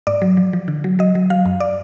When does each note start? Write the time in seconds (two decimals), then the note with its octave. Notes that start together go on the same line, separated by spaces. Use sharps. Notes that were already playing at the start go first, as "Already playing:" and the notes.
0.07 G#2 D5
0.22 F#3
0.37 F3
0.53 F3
0.68 D3
0.84 F#3
0.99 F#3 D#5
1.15 F#3
1.30 F#3 F5
1.45 F#2
1.60 D5